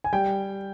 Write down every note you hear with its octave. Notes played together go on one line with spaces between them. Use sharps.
G#5
G3 G5